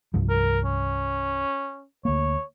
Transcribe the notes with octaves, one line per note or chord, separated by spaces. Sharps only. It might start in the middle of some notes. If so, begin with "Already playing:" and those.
C2 G2 F3
A#4
C#4
D2 A#3 C#5